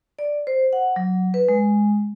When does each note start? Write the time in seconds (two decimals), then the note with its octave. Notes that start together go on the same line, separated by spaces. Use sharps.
0.19 D5
0.47 C5
0.73 F#5
0.96 F#3
1.34 B4
1.49 G#3